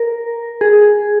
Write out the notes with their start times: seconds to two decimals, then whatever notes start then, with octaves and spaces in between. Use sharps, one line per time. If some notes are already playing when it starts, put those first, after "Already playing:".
Already playing: A#4
0.61 G#4